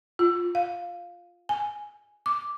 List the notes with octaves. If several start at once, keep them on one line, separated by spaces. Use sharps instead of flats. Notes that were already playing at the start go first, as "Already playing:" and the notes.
F4
F5
G#5
D6